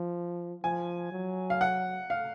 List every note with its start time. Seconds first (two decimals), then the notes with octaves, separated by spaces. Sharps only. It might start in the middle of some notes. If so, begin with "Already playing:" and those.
Already playing: F3
0.63 F3 G#5
1.12 F#3
1.50 F5
1.61 F#5
2.10 F5